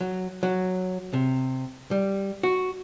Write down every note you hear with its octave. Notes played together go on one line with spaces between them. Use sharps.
F#3
F#3
C3
G3
F#4